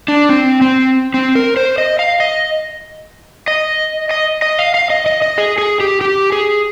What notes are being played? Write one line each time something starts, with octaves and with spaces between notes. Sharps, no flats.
D4
C4
C4
C4
A#4
C5
D#5
F5
D#5
D#5
D#5
D#5
F5
F5
D#5
D#5
D#5
G#4
G#4
G4
G4
G#4